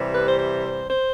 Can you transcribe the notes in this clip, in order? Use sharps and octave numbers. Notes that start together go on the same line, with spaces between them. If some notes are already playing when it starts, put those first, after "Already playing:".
Already playing: C3 E3 G3
B4
C5
C5
C5